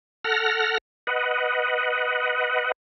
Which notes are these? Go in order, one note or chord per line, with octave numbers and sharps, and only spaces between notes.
A4 F#5 F6 A#6
B4 D#5 F#5